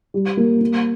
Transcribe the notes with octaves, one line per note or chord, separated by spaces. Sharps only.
G3
A#3
A#3